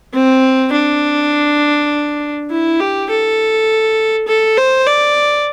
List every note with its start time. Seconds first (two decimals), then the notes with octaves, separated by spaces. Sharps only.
0.13 C4
0.73 D4
2.50 E4
2.80 G4
3.09 A4
4.27 A4
4.57 C5
4.86 D5